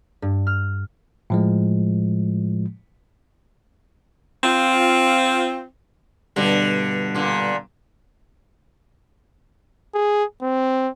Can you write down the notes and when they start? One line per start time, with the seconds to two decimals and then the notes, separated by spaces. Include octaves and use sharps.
0.22 G2
0.47 F6
1.30 A2 F3 G#3
4.43 C4 F4
6.36 G2 B2 D3
7.15 A#2 D3
9.94 G#4
10.42 C4